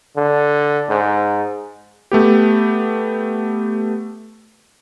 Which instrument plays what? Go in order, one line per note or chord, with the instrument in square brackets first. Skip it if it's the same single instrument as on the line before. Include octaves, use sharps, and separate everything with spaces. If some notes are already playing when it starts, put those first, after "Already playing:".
[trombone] D3
G#2
[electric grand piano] A3 B3 G4